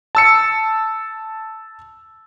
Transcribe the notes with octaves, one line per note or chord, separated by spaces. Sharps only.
A5 E6 C#7